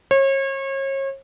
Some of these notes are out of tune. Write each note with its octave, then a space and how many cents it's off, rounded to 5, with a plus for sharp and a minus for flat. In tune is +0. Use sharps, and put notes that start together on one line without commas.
C#5 -35